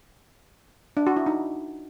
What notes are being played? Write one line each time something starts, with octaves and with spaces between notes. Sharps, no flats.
D4
F#4
E4
D#4